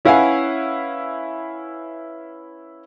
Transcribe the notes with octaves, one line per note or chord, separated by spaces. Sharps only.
C#4 E4 B4 F5 F#5 G#5